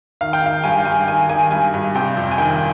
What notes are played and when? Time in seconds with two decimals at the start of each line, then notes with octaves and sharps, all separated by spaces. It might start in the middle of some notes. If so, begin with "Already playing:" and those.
0.21 D#3 F5
0.33 G5
0.42 D#3 F5
0.64 G2 G#5
0.85 G2 G#5
1.08 D#3 G#5
1.29 D#3 G#5
1.51 G2 G#5
1.74 G2
1.95 C3 G5
2.17 F2
2.31 G#5
2.38 D#3 G5